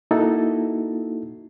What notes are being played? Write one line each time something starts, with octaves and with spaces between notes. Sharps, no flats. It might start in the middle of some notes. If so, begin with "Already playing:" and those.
A#3 D#4 E4 F#4 A4